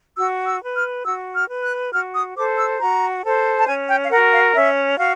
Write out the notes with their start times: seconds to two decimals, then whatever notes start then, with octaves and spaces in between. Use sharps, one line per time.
0.18 F#4 E6
0.47 E6
0.62 B4
0.76 F6
1.06 F#4 E6
1.34 F6
1.49 B4
1.64 F#6
1.92 F#4 F6
2.14 D#6
2.36 A4 C5 D6
2.58 E6
2.80 F#4 A#5
3.24 A4 C5
3.59 A5
3.68 C#4 G#5
3.90 G5
4.05 F5
4.11 F#4 A#4 F#5
4.33 F5
4.55 C#4 E5
4.99 F#4 F5